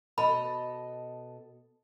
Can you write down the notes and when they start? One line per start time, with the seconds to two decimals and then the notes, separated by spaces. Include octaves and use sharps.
0.18 B2 A4 D#5 B5